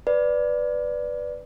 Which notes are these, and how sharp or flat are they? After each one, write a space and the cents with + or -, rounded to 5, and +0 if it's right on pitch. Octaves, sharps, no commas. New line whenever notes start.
B4 +5 D5 +0